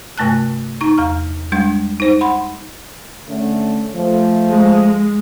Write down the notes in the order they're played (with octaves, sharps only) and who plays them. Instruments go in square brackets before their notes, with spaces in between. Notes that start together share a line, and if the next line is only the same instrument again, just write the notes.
[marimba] G2 C3 A3 A5 F#6
D#4 A#5 C#6
E2 A#5 F6
G3 G#3 D4
D#4 C5
F#5 B5 C6
[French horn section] D3 A3 C#4
F3 A3
[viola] G#3